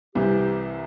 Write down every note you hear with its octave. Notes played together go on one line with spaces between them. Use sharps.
C2 C3 E3 G4